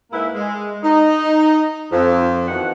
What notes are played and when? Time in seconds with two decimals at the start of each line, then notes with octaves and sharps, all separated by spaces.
0.12 G#2 A#3 E4 B4 E5
0.34 G#3
0.83 D#4
1.91 F2
2.48 B2 D#3 E3 F#5